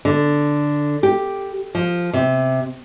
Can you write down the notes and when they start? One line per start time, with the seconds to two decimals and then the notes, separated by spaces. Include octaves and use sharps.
0.05 D3
1.03 G4
1.75 F3
2.13 C3